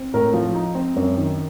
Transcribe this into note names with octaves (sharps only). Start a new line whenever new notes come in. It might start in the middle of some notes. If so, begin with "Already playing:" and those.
Already playing: C4
A2 A#4
F3
D#4
C4
F#2
D#3